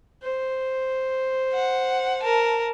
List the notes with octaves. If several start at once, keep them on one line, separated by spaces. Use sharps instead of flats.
C5
F#5
A#4 A5